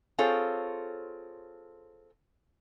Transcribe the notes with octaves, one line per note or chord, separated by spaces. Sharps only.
C4 F4 G#4 A4 C#5